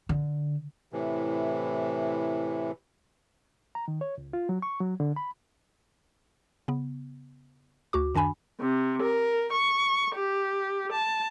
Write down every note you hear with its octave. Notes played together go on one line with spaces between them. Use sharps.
D3
A2 C3 E3
A#5
D#3
C#5
C#2
F4
F#3
C#6
F#3
D3
B5
C#3 B3
D2 F#4 D6
F#2 D#3 D4 G#5 B5
C3
A#4
C#6
G4
A5